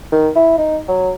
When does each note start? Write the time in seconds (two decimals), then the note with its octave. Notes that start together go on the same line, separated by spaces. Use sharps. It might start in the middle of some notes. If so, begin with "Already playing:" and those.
0.12 D#3
0.35 E4
0.58 D#4
0.88 F#3